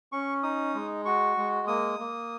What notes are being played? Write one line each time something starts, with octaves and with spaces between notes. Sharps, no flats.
C#4 C#6
D#4 D#6
G#3
F#4 C#6
G#3
A#3 D#6
A#3